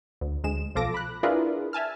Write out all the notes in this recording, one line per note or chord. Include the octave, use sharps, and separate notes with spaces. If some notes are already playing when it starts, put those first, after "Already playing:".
D2
D2 G#3 E7
B1 F3 F4 A4 D6 A#6
B5 F#6
D4 E4 F4 G#4 A#4 B4
E5 G#5 A5 F6